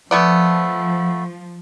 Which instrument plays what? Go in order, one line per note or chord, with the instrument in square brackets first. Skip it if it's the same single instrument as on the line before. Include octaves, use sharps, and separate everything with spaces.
[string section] F3 [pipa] A3 B3 D5